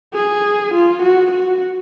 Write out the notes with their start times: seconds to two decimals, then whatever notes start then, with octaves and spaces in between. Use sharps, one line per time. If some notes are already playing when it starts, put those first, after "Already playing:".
0.14 G#4
0.74 F4
1.02 F#4
1.31 F#4